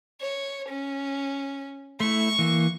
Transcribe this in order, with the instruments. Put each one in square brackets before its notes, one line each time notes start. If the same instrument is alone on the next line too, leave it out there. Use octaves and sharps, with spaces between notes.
[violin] C#5
C#4
[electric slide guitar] A3 E4 [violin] C#6
[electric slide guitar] E3 A#3